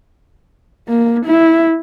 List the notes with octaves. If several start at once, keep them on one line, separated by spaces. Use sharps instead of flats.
A#3
E4